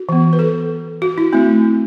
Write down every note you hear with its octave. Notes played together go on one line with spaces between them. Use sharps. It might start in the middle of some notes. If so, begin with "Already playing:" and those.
Already playing: F#4
E3 B3
B4
A4
F#4
E4
A3 C4 E4